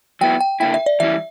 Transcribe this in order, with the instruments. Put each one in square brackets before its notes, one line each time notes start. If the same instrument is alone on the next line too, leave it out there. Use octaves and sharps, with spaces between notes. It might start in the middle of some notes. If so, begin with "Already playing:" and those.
[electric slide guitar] F#3 B3 E4 [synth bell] G5
[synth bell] G5
[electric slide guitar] D3 A#3 E4 [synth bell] G5
[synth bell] E5
D5
[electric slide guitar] E3 G3 C#4 E4 [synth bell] E5